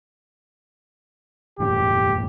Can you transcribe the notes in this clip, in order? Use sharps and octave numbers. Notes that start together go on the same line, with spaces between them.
F#1 E2 A2 G4